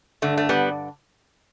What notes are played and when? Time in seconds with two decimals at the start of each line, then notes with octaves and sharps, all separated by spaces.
0.22 G2 D3 A3
0.37 A3
0.49 G3 B3